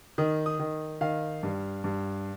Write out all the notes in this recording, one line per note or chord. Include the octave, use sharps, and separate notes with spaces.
D#3 D#6
D#6
D#3
D#3 F5
G2
G2